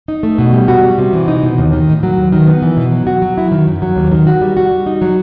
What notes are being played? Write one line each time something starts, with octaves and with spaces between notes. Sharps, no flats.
D#4
A3
B2
G3
F#4
G3
C3
E3
D#4
B2
D#2
D#3
A2
F#3
D#2
D#3
B3
E3
B2
F#3
F#4
F#3
E4
D#3
F#2
F#3
D#2
D#3
F#4
G3
F#4
G3
D#4
F#3